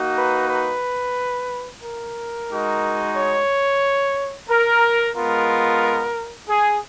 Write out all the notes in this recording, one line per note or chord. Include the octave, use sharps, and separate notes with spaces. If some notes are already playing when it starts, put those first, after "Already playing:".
Already playing: A#3 D#4 F#4
B4
B4
A#4
G#3 D#4 F#4
C#5
A#4
G#3 B3 F4 A#4
G#4